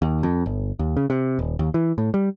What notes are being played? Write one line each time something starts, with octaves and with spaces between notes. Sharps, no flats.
D#2
F2
G1
D#2
C#3
C3
D#1
D#2
E3
A2
G3